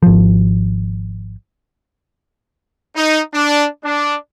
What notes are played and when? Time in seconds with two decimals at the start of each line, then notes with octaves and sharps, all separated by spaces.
0.03 G#1 F3
2.96 D#4
3.34 D4
3.84 D4